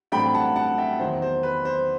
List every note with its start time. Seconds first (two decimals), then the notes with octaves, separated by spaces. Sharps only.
0.12 A1 G2 F#3 A3 C4 G5 B5
0.34 F#5 A5
0.56 F#5 A5
0.78 E5 G5
0.99 E2 D#3 F#3 C5
1.22 C5
1.43 B4
1.65 C5